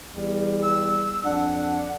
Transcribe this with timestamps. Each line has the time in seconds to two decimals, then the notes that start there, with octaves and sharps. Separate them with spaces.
0.15 E2 G3
0.62 E6
1.24 F2 D4 F#5